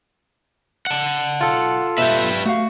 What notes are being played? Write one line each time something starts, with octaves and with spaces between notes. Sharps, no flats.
F#5 A5
B1 F4 A4
B2 B3 G4 B4 E5
A3 F#4 F5